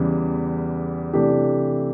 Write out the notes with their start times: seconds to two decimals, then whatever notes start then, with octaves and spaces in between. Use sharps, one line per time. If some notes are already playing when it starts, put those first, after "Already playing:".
Already playing: E2 C#3 E3 G3
1.13 C3 E3 A3 D4 G4